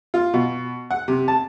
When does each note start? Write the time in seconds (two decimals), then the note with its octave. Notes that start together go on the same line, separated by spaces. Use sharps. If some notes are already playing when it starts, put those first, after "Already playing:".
0.14 F4
0.34 B2
0.91 F#5
1.08 C3
1.28 A5